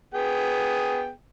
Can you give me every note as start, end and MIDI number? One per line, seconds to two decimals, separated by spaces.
0.14 1.10 59
0.14 1.10 68
0.14 1.10 79